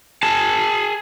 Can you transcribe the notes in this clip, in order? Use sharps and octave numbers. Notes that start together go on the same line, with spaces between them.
G#4 A5